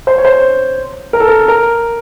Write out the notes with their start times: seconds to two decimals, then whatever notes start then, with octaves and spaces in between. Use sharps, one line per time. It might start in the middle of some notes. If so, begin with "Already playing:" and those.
0.07 C5
0.18 C#5
0.25 C5
1.13 A#4
1.20 A4
1.28 A#4
1.48 A#4